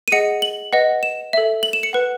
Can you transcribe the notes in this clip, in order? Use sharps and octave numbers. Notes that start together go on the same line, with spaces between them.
D#7
G#4 D#5 F#5 C#7
F#7
B4 D#5 F#5
E7
A4 E5
F#7
E7
C#7
B4 F#5